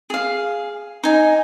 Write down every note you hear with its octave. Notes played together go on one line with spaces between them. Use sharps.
G#4 F5
D#4 D#5 G#5